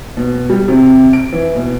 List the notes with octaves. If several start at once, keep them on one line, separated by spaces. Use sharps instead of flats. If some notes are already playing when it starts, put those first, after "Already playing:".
B2
G3
C3
D7
E3
B2